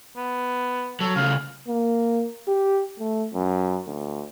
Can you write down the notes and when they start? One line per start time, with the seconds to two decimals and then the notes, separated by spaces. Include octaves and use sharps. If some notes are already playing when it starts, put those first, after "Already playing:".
0.16 B3
1.01 F#3 A4
1.16 C#3 A3 F5
1.68 A#3
2.48 G4
3.00 A3
3.34 F#2
3.87 D2